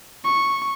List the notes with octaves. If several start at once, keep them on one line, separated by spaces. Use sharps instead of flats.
C#6